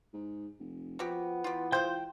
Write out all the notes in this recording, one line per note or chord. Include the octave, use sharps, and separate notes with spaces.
G#2
F1
F3 B3 F#4 G4
E3 F4 G4
G#3 F4 C5 G5 G6